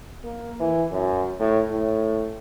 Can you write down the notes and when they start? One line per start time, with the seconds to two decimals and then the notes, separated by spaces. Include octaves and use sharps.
0.24 A#3
0.60 E3
0.92 F#2
1.40 A2
1.70 A2